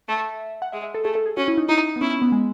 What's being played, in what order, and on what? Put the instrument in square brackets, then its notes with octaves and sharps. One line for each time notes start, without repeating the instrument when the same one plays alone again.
[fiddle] A3 [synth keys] E5
[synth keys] F#5
[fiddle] G#3 [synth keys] E5
[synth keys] E5
A4
[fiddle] A3 [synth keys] G#4
[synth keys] A4
G#4
[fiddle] C#4 [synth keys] F#4
[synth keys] E4
D#4
[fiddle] D#4 [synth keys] E4
[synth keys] B3
[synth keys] C#4 [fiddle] E4
[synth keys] C#4
B3
G#3